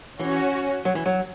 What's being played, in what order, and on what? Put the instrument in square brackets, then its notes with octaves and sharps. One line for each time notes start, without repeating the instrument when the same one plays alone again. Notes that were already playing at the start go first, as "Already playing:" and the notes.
[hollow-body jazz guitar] E3 [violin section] C#4 F#4 C#5
[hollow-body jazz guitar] F#3
E3
F#3